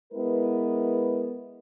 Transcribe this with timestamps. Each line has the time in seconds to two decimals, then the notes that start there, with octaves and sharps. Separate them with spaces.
0.13 G#3 B3 E4 A#4 B4